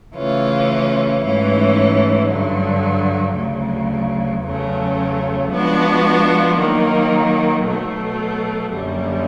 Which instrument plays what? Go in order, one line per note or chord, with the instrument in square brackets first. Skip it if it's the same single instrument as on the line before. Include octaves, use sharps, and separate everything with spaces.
[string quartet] C#3 E3 A3 C#4 F4
G#2 E3 A3 C#4
G2 D3 F#3
D2 C#3 F#3
E2 C#3 F#3 A3 C#4
F3 G#3 B3 D4 F#4
D#3 F#3 A#3
B2 F#3 A3
F#2 D3 G3 A#3 C#4